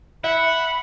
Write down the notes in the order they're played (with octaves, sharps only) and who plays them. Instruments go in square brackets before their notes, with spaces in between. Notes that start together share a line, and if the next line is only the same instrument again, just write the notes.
[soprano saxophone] E5 [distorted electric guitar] F#5 [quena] B5